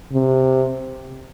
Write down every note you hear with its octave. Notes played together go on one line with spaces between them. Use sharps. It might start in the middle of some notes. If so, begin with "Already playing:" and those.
C3